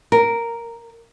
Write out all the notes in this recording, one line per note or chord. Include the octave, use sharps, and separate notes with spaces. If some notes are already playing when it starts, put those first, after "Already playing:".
A#4